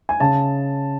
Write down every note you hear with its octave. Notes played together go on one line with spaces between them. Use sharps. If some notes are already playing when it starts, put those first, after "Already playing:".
G#5
C#3 A5